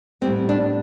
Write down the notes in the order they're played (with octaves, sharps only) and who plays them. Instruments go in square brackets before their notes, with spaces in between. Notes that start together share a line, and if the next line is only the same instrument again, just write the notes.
[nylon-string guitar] A2 G3 B3 C4
D4